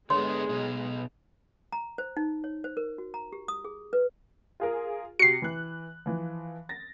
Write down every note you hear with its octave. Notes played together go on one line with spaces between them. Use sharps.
D3 G#3 B3 C#5 C6
B2 D#4
A#5
C5
D#4
C#5
C5
A#4
F#4
A#5
G4
D#6
G#4
B4
F4 G#4 A#4
C3 F#4 C7 C#7
E3 F#6
E3 F3
A6 A#6